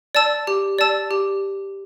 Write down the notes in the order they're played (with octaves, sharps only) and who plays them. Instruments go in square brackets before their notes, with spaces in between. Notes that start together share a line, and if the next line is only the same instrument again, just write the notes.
[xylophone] D5 A5 E6
G4
D5 A5 E6
G4